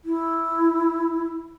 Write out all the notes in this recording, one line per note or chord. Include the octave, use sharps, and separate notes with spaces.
E4